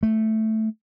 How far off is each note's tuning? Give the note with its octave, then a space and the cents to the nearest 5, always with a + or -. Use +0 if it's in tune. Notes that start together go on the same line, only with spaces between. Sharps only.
A3 +0